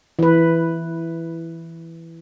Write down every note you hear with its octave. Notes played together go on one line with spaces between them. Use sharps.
E3 B4